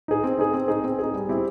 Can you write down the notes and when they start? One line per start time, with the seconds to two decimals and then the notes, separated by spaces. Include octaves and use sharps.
0.08 D#4 G#4
0.24 C4
0.38 D#4 G#4
0.53 C4
0.68 D#4 G#4
0.84 C4
0.99 D#4 G#4
1.14 G3
1.29 C4 E4 G4